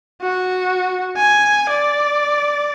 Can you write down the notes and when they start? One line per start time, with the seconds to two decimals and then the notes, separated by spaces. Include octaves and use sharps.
0.21 F#4
1.16 G#5
1.69 D5